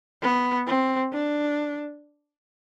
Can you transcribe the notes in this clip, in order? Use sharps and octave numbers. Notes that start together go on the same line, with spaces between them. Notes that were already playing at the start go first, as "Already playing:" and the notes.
B3
C4
D4